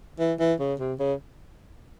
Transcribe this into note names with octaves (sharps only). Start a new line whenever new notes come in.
E3
E3
C#3
C3
C#3